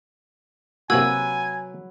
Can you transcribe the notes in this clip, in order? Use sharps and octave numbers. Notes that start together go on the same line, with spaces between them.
C3 F#3 A#3 F#4 B4 G#5 E6 G#6